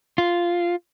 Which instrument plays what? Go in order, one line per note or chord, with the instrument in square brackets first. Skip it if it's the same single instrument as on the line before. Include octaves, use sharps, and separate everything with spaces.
[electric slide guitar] F4